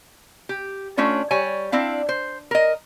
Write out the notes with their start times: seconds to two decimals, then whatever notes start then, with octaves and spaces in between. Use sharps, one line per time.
0.49 G4
0.97 A3 C#4 D4 F4 C#5
1.31 G3 C#5 G#5
1.72 C4 D4 E4 F5
2.09 C5
2.51 A#4 D#5